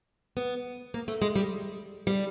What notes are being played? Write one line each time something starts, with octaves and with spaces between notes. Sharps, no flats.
B3
A#3
A3
G#3
G3
G3